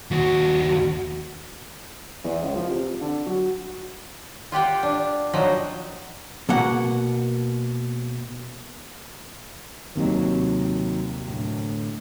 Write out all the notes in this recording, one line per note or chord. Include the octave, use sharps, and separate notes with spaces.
D#2 F#4
E2
C#2
F3
C3
D3
F#3
F4 G4 F#5 G5
D4
F3 F#3 D#4
B2 A#3 F#5
D#2 C3 D#3 F#3 D#4
A2 D3